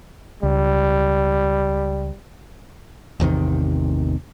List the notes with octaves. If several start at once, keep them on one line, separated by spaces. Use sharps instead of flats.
C#2 G3
A1 E2 C3 D#3